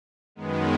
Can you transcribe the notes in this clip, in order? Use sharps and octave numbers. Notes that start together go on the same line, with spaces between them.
F#2 D#3 G#3 B3